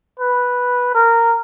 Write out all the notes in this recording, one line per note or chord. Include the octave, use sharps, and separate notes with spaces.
B4
A#4